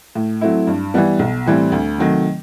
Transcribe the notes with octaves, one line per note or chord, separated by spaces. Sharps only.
A2
F#3 A3 C4 E4
G2
E3 G3 B3
B1
A2 E3 G3 C4
D2
C3 D#3 F#3 A3